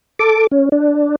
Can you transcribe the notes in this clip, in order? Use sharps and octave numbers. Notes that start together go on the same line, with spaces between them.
A4 D6
C#4
D4